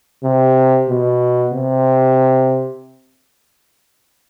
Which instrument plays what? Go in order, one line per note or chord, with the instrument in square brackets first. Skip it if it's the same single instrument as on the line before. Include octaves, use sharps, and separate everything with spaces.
[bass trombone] C3
B2
C3